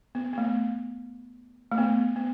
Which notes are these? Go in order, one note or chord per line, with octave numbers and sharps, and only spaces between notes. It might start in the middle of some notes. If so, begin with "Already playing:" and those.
B3
B3
A3
A3
B3
B3